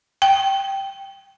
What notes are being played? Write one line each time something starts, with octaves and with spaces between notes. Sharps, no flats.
G5